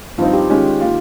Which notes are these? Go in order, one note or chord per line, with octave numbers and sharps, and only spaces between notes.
G2 F3 C4 D#4 F4
G4
D#3 G#3 C#4 G4
D#3 A#3 F4